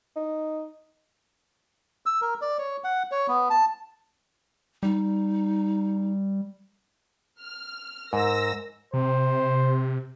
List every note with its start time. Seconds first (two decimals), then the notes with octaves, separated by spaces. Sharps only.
0.16 D#4
2.06 E6
2.22 A#4
2.41 D5
2.59 C#5
2.84 F#5
3.11 C#5
3.28 B3
3.50 A5
4.83 G3 D#4
7.40 F6
8.13 G#2 A#4 E6 A#6
8.94 C3 C5